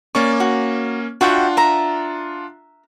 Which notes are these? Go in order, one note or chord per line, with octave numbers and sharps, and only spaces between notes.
A#3 C#4 D5 C#6
F#4
D4 F4 F#4 E5 F#5 G5
E5 A#5